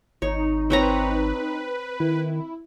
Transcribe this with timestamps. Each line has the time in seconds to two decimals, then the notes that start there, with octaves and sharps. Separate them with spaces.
0.22 G#1 D#4 C#5
0.70 C4 B4 C#5 A#5
2.00 D#3 E4